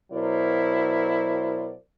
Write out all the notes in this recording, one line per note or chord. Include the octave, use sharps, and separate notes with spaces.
B2 F#3 E4 A#4 C5 D5